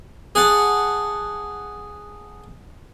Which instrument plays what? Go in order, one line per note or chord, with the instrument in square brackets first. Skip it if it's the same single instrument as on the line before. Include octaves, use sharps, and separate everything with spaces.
[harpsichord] G#4 F#5 A5